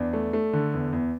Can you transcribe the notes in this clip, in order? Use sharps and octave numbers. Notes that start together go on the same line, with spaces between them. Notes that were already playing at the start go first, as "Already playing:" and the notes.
Already playing: E2 D4
A3
A3
D3
E2
E2